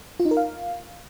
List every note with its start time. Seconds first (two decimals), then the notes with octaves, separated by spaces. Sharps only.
0.20 F4
0.25 D#4
0.31 A#4
0.37 F5